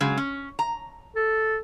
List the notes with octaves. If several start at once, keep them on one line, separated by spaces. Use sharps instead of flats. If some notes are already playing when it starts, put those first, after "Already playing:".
C#3 F#3 G#3
C#4
A#5
A4